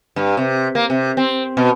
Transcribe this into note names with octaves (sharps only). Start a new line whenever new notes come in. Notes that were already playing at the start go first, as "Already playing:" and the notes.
G2
C3
A#3
C3
C4
B2